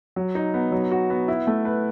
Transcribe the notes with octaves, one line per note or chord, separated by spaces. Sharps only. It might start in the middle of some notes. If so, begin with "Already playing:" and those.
F#3
D#4
B3
F#3
F#4
B3
E4
A3
B4